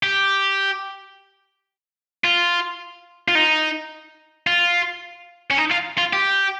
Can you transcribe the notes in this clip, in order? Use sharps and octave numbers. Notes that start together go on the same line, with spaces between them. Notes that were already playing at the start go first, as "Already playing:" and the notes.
G4
F4
F4
D#4
F4
C#4
D#4
F4
F4
G4